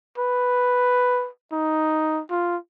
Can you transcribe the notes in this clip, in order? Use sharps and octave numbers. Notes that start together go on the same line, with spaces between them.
B4
D#4
F4